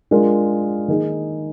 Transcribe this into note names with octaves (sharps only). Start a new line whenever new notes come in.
G#3 D4 F4 A#4
D#3 A#3 D#4 G#4